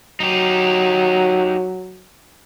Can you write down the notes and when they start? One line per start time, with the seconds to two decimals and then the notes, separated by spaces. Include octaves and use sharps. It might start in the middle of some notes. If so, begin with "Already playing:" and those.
0.20 F#3 D#4 G4